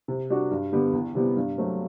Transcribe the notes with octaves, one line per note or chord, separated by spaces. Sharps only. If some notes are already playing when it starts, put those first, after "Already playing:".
C3
G3 D4 F#4
G2
D3 G3 B3
E2
C3 E3 G3 B3
G2
F#3 A3 C4